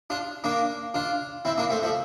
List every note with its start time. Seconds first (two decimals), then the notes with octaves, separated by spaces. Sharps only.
0.10 D4 F4
0.44 A#3 D4
0.94 D4 F4
1.45 C4 E4
1.58 A#3 D4
1.70 A3 C4
1.83 F3 A3